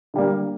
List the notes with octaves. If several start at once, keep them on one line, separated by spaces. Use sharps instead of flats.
D3 G3 A#3